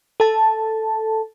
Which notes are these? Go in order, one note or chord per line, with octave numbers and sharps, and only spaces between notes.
A4 A5